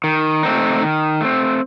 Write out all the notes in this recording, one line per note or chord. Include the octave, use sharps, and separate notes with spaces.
D#3
A3 C4 D#4
D#3
A3 C4